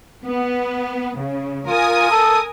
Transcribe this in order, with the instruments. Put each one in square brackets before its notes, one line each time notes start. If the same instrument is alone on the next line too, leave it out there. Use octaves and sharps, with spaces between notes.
[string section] B3
C#3
[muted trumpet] F4 [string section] A#4 G#5 D#6
[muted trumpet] A4